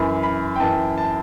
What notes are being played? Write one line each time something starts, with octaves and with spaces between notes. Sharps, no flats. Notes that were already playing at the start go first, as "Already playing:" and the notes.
Already playing: F#2 E3 B5
B5
G5
F#2 E3 A5
A5